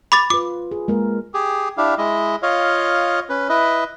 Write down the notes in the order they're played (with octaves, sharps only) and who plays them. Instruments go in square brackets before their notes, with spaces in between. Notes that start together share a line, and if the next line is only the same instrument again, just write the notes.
[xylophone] B5 D6 A6
[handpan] F4 B4 [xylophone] D6
[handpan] G#4
G#3 A#3 A#4
[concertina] G4 G#4
D4 E4 G4 F5
G#3 E4 D#5
F4 C#5 D#5 F5
C#4 B4
E4 B4 D#5